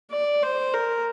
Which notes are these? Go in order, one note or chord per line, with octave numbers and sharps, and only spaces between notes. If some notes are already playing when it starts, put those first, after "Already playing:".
D5
C5
A#4